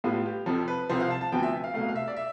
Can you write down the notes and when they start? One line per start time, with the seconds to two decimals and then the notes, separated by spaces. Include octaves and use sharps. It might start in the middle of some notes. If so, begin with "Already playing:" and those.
0.04 A2 G3 B3 F4
0.26 G4
0.46 F2 C3 F3 A4
0.68 B4
0.89 C2 C3 F3 C5
1.00 F5
1.11 A5
1.21 A5
1.32 D2 C3 F3 B3 G5
1.43 E5
1.64 F5
1.74 C2 B2 A3 F5
1.89 F5
1.96 E5
2.08 D5
2.17 E5